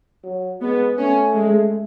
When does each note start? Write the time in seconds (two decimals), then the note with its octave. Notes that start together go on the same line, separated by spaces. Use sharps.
0.24 F#3
0.61 G#3 B3
0.98 A3 C#4
1.35 G#3